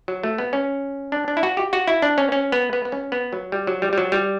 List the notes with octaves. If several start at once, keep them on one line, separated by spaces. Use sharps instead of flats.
F#3
A3
B3
C#4
D4
D4
E4
F#4
G4
F#4
E4
D4
C#4
C#4
B3
B3
B3
C#4
B3
F#3
G3
F#3
G3
G3
F#3
G3